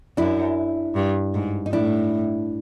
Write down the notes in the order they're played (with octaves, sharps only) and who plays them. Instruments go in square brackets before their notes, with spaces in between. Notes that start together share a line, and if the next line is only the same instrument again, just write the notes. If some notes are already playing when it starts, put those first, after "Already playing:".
[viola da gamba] F#2 [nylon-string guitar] D4 E4
[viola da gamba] G2
G#2
[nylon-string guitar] D#4
[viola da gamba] A2 [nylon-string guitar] D4 E4